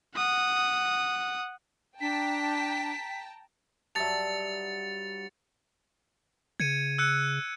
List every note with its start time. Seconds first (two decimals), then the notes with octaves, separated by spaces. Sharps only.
0.16 F#5 D#6
2.01 D4 G5 A5 A#5 B6
3.95 G2 F#3 E5 A5 A6 C#7 F7
6.60 C#3 G#6 C#7 D#7
6.98 E6 F#6 C#7